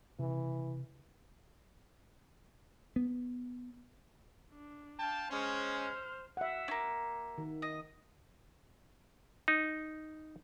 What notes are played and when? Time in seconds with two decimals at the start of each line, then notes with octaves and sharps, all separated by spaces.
0.19 C3 E3
2.96 B3
4.52 D4
4.99 F5 G5 A5
5.30 G#3 C#4 C5 F6
6.37 E5 F#5
6.68 A#3 C#4
7.38 D#3
7.62 D#5
9.48 D#4